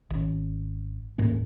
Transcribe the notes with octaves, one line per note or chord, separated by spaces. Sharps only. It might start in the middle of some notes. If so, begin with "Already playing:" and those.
G#1 C#4
D#1 G#2 A#3 C#4